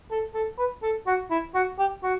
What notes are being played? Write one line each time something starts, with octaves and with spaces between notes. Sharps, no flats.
A4
A4
B4
A4
F#4
E4
F#4
G4
F#4